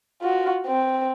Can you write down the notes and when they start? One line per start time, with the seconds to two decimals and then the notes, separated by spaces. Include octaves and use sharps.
0.22 F4 F#4
0.66 C4